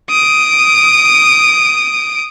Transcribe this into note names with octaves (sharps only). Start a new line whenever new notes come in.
D#6 D7